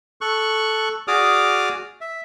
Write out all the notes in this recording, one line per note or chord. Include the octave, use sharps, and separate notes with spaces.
A4 C#6 F#6
F#4 G#4 D5 D6 D#6 F6
E5